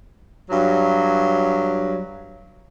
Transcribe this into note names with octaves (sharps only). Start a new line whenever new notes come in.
G2 F#3